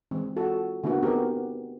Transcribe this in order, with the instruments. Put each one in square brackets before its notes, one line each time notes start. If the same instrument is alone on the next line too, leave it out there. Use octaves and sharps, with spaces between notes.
[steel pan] E3 G#3 C4
F4 F#4 A4
D3 A#3 B3 E4 F#4
B3 C4 D#4 G4 G#4 A#4